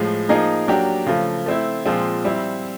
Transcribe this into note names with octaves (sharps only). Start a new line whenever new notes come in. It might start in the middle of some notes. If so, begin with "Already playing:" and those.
Already playing: A2 F3 G#3
F3 A#3 D#4 G#4
F#3 A#3 D4 G4
C#3 F3 A3
A3 C4 E4
A#2 F3 G#3 C4
G3 C4 E4